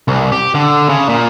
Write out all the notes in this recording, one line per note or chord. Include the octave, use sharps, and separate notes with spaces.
C2
G4
D3
C#3
A#2